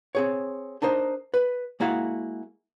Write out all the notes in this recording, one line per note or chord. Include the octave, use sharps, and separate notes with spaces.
C4 G#4 C#5
D4 D#4 A#4 C5 D#5
B4
G#3 A#3 E4 F#4 F5 F#5